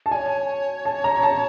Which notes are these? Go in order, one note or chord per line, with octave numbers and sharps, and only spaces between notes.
A5
C#5 D5 G#5
A5
A#5
A5